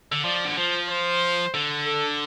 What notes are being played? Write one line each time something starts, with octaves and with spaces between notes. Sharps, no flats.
D3
F3 D5
D3
F3 C5
C5
D3
A4